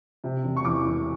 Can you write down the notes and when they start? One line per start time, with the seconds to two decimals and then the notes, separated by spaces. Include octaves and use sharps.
0.24 C3
0.44 E1
0.57 C#6
0.65 E2 D6
0.85 E1